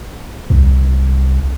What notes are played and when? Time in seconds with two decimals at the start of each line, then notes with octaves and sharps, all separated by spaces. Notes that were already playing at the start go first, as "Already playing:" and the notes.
0.50 C2